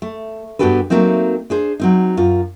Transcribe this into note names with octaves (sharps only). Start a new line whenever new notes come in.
A3
G2 B3 F#4 G4 A4 B4
F#3 A3 A#3 C4 D#4
D4 G#4 C5
F#3 C4 D#4
F#2 F4